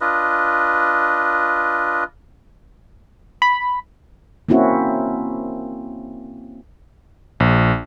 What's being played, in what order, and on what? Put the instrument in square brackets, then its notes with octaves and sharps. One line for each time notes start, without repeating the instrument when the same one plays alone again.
[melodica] D4 F4 B4 D#5
[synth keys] B5
[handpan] A#3 C4 C#4 E4 F#4
[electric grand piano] A#1